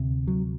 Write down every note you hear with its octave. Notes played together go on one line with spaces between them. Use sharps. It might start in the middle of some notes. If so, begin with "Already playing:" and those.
Already playing: D2 C3
F#3